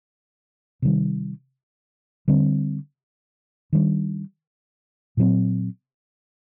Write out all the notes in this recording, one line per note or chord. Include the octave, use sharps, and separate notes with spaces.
C3 D#3 G3
D3 G3 C4
D#3 G3 D4
A#2 F#3 C4